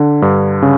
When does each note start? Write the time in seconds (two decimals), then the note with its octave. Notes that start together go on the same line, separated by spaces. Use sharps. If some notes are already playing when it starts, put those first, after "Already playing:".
Already playing: D3
0.22 G2
0.62 C#3